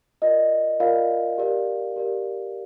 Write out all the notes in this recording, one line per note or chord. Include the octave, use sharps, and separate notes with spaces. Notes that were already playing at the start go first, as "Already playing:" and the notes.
F4 A#4 D5 D#5
F4 A#4 D5 F5
G4 A#4 D5
G4 A#4 D5